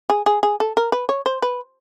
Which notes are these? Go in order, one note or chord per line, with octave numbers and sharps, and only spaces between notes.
G#4
G#4
G#4
A4
A#4
B4
C#5
C5
B4